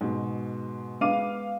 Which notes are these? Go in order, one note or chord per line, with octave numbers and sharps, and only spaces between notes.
G#2 B2
G#3 B3 D#5 F5 D6 D#7